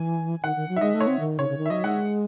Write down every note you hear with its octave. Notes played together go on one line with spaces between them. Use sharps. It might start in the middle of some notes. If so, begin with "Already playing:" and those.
Already playing: E3 G#5
D#3 F#5
D#3
F#3
E5
G#3 D#5
A3
C#5
C4
D#3
C#3 C#5
C#3
D#3
E5
F#3 D#5
G#3 F#5